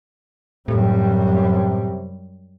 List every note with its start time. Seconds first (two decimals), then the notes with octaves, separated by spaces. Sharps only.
0.68 F#2 A2 C3 G3